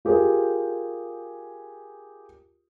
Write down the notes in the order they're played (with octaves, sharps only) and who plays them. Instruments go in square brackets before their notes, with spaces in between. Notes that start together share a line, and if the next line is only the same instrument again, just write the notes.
[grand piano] F4 G4 G#4 A#4